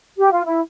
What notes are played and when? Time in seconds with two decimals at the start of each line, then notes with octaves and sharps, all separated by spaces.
0.17 G4
0.31 F4
0.45 E4